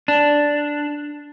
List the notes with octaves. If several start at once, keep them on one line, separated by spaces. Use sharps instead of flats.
D4